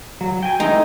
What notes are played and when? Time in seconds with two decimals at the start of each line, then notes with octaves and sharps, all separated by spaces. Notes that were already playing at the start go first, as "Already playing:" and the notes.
0.21 F#3
0.43 G5 G#5
0.60 G#3 A3 D#4 E4